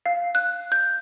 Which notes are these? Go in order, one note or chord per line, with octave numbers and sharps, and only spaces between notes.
F5
F#6
G6